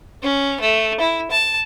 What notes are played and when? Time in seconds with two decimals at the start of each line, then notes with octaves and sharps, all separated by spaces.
0.23 C#4
0.60 A3
1.00 E4
1.31 A5